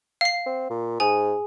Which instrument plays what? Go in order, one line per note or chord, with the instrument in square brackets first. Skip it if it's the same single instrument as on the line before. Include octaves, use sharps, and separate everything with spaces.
[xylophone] F5 C7
[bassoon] C4
A#2
[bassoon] G#2 [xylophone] G#4 G#5